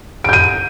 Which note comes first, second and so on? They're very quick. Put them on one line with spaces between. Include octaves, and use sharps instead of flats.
D7 G6 D#7